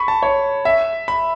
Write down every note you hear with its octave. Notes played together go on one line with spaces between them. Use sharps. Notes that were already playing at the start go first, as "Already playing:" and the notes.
Already playing: B5 C#6
A5
C#5
E5
B5